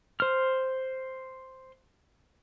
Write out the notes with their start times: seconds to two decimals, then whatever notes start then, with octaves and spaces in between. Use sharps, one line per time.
0.20 C5 F6